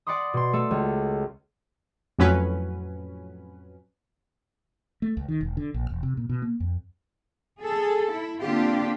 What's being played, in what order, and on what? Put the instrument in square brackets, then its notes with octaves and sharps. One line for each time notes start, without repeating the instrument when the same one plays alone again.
[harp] D5 F#5 B5 C6 D#6
B2 C6
A3 A4
C#2
[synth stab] F2 A2 F#3 C#4 B4
[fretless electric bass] A3
C#2
D#3
E1
D3
A#1
E1
C3
A#2
B2
A#3
F2
[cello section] G#4 A4
E4
D3 A#3 C4 D4 F4 G4